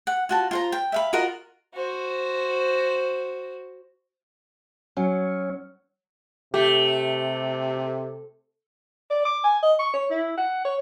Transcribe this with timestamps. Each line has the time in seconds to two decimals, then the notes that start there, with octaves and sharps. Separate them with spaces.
0.07 F#5
0.29 F4 F#4 A5
0.51 F4 C5 A#5
0.72 G5
0.92 E5 F5 B5
1.13 F4 F#4 A#4 D#5
1.75 F#4 C5
4.97 F#3 C#4
6.54 C3 A3 G4
9.10 D5
9.25 D6
9.44 G#5
9.63 D#5
9.79 C#6
9.93 C#5
10.10 E4
10.37 F#5
10.65 C#5